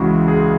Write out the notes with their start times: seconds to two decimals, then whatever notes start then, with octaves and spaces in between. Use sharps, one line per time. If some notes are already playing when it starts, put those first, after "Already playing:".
Already playing: C#2 C#3 E3 G#3 F#4
0.28 G#4